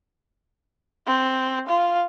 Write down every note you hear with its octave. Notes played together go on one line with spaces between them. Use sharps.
C4 C5
F4 F5